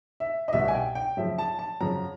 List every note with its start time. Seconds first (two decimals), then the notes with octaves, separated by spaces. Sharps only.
0.20 E5
0.48 D#5
0.53 C2 B2 E5
0.68 G#5
0.75 G5
0.95 G5
1.17 F#2 C#3 F3 E5
1.38 A5
1.59 A5
1.81 F#2 C#3 F3 A#5